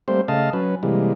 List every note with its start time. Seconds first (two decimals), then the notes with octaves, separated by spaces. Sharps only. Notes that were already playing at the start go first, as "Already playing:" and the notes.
0.08 G3 A3 A#3 C4 C5
0.28 C#3 A3 D#5 F5 A5
0.53 F#3 C#4 B4
0.83 C3 E3 G3 G#3 A#3